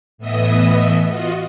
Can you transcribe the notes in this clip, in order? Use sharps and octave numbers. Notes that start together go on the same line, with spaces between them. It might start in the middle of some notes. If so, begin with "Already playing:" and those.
A2 E3 B3 D#5 E5 D#6
F4 F#4 D#5